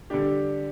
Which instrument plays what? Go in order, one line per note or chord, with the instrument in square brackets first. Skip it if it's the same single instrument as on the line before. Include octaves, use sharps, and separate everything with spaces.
[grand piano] D3 G3 D4 G4